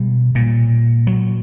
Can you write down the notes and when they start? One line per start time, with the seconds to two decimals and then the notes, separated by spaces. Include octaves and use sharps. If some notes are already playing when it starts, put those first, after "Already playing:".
Already playing: B2 G3
0.35 A#2
1.07 F#3